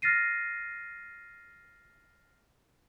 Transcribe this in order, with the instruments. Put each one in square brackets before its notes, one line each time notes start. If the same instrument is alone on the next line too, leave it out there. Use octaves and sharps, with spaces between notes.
[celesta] F6 A6 A#6 C7 D#7